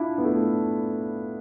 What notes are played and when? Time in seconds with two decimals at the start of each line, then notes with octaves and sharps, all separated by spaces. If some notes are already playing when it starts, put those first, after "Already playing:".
Already playing: D4 E4 F4
0.18 B3
0.24 A3